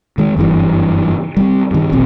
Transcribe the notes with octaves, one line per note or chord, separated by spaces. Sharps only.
D#3 G#3
F#1 G2 C3 E3
G3 A#3 C4
G2 D#3
E1 A#1 B2 C4